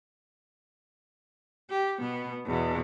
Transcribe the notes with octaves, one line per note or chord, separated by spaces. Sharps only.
G4
B2 B3
E2 B2